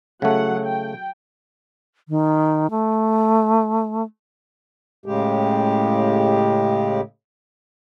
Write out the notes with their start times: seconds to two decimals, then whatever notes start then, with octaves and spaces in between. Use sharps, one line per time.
0.22 C#3 F#3 A3 F#5
0.66 G5
2.09 D#3
2.70 A3
5.06 A2 C#3 G#3 G4